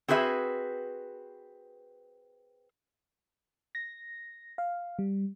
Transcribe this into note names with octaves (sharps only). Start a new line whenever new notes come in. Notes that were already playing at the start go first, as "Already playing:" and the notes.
C4 F#4 G#4 B4 E5
A#6
F5
G3